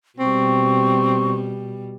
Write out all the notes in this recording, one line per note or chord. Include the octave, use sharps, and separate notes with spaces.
B2 G3 C4 C#6